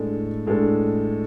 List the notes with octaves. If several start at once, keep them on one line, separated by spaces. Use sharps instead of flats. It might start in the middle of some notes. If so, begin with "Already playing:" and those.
Already playing: A2 G#3 D4 A4
A2 G#3 D4 A4